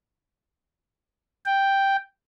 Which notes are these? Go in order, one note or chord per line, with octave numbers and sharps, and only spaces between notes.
G5